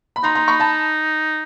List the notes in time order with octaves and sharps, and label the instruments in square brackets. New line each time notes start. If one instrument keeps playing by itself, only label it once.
[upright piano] B5
[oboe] D#4 [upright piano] A#5 C6
[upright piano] A#5 C6
B5 C#6
A5 B5